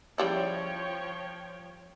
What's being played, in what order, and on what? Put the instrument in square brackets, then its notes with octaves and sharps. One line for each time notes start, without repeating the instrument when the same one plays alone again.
[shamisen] C#3 G3 E4 [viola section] F3 C#5 G5